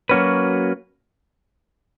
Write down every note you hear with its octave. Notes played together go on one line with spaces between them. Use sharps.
F#3 A#3 C#4 F#4 B4